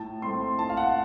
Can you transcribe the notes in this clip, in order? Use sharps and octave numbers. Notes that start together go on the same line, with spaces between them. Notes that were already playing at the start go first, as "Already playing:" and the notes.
Already playing: A2 A5
A3 C4 C6
A2 A5
F5
F#5